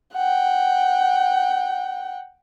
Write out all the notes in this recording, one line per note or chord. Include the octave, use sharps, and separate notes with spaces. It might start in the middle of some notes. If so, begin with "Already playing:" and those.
F#5 G5